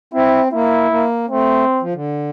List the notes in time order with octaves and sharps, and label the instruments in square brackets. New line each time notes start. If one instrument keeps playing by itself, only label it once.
[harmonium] C4 [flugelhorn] E4
[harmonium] A#3 [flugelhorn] E4
[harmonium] A#3
[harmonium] A3 [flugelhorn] C4
[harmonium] F3
D3